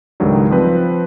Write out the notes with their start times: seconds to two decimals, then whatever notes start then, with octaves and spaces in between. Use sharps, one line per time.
0.20 C#2 G#2 D3 D#3 F#3 G3
0.50 F3 C4 B4